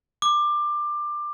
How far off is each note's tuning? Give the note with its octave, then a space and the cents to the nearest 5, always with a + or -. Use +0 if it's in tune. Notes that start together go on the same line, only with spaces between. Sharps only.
D6 +20